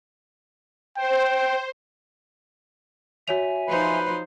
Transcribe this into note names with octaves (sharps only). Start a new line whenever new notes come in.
C5 G5
F#4 C#5 E5 G#5 F7
F3 D#4 B4 C5